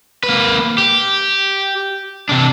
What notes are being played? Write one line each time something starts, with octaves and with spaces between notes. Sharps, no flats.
A#3 B4
G4
C3 D4